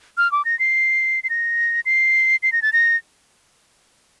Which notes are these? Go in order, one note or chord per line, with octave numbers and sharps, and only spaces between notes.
F6
D6
A#6
C7
C7
A#6
C7
C7
A#6
A6
A#6